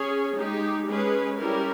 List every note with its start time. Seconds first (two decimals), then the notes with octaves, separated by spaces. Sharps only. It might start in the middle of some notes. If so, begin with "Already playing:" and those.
Already playing: C#4 G#4 C#5
0.36 G#3 D#4 G4
0.87 G#3 C#4 G#4 B4
1.38 G3 C#4 E4 G4 A#4